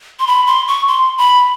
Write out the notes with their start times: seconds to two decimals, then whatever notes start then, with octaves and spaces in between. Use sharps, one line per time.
0.20 C6
0.27 B5
0.47 C6
0.68 C#6
0.88 C6
1.18 B5